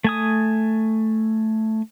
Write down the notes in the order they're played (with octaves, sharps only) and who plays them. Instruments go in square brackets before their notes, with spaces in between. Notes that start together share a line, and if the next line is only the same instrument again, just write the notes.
[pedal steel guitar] A3 G#5 D#6